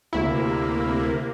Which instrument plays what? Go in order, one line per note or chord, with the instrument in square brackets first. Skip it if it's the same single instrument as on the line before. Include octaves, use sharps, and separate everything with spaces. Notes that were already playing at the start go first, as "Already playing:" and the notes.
[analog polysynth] D2 E4 [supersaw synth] C3 A#3